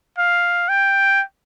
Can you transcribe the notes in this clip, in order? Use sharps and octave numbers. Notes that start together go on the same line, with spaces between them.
F5
G5